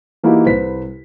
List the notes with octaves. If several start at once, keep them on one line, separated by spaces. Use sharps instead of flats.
E3 A#3 D#4 E4 F#4 G4
C2 C3 B4 C5 B6